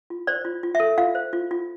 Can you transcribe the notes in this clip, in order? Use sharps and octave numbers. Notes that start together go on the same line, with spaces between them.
F4
C5 D5
F4
F4
E5
A4
F4 F5
C5
F4
F4